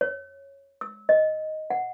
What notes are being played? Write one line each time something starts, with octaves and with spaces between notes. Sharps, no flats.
C#5
E6
D#5
F#5